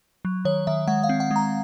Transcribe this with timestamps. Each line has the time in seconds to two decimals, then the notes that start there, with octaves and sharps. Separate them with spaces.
0.25 F#3
0.45 D#3 C#5
0.67 D#3 E5
0.87 G#3 F#5
1.03 F5
1.09 C4
1.20 F#5
1.31 G#3
1.36 A#5